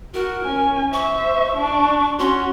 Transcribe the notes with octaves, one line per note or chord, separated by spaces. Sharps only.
F#4 A#4
C#4 G#5
C5 E5 C#6
D4
C#4 F#4 C6